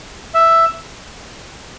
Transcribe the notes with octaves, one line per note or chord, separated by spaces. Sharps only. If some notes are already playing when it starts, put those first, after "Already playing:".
E5